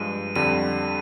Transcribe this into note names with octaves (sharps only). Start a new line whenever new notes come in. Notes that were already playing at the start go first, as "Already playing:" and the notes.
Already playing: G2 F3 G#3 D#7
F2 D3 G3 D#7